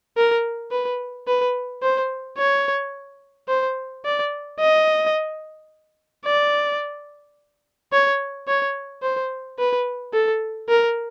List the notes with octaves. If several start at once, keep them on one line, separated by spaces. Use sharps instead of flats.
A#4
B4
B4
C5
C#5
C5
D5
D#5
D5
C#5
C#5
C5
B4
A4
A#4